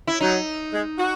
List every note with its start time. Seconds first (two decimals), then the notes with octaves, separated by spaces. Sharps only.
0.07 E4
0.21 F#3 D#4
0.73 G#3
0.98 F#4